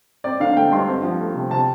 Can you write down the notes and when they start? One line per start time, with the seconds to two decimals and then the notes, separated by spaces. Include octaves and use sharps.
0.24 C4 D5
0.40 D3 F5
0.56 A3 G5
0.71 G2 C6
0.88 C4
1.03 F3
1.20 A3
1.35 C3
1.51 C3 A5